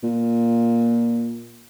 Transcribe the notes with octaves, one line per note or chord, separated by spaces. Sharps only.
A#2